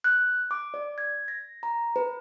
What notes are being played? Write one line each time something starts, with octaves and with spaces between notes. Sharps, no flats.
F#6
D6
D5
G#6
A#6
A#5
B4